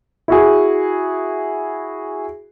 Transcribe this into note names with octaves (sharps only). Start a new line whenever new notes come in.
E4 F#4 G#4